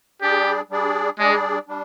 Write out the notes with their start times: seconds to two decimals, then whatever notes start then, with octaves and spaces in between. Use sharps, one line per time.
0.22 G3 D4 G4 G#4 D5
0.70 G3 D4 G#4 D5
1.19 G3 G#3 D4 G#4 D5
1.68 G3 D4